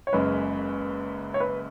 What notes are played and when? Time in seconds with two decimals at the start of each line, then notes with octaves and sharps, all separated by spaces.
0.07 C#5
0.12 F#1 F#2 C#3 G#3 B4
1.34 C#5
1.40 B4